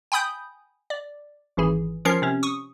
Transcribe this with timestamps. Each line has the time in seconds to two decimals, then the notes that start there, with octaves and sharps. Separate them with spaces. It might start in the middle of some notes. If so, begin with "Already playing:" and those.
0.12 G5 G#5 B5 D#6 G6
0.90 D5
1.57 G#1 E3 G#4
2.05 F3 C#4 A#4 C7
2.22 C3 C#4
2.43 C#6 D#6